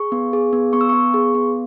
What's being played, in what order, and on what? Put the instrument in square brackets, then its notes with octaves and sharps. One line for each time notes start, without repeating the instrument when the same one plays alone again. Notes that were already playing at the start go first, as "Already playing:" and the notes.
Already playing: [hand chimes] G#4 C#6
B3
G#4
B3
B3 C#6
E6
B3 C#6
G#4
B3